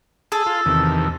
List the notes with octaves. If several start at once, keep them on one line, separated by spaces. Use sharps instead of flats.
G#4 A4
F4
E2 C3 D#3